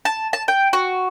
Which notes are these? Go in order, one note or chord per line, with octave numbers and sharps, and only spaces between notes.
A5
A5
G5
F#4